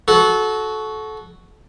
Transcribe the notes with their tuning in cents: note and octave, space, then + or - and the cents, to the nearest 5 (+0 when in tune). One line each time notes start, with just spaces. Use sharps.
F#4 +0 A4 -25